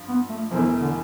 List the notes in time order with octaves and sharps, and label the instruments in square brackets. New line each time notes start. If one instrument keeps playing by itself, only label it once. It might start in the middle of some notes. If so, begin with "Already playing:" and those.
Already playing: [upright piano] G2 F3
[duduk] B3
A3
[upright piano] E1 E2 B2 A3 E4 [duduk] F3
[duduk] E3
D3